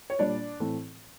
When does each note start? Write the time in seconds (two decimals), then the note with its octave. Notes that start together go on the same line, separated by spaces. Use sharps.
0.10 C#5
0.19 A#2 G3 A#3 D4 D5
0.60 A2 E3 A3 C4